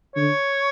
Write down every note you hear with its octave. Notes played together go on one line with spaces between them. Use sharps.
D3 C#5